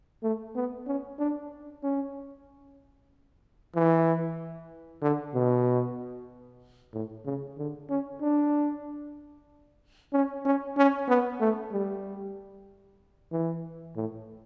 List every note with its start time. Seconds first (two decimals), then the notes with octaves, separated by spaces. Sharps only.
0.23 A3
0.56 B3
0.87 C#4
1.19 D4
1.83 C#4
3.75 E3
5.02 D3
5.35 B2
6.94 A2
7.25 C#3
7.58 D3
7.90 C#4
8.22 D4
10.13 C#4
10.45 C#4
10.77 C#4
11.08 B3
11.40 A3
11.72 G3
13.32 E3
13.96 A2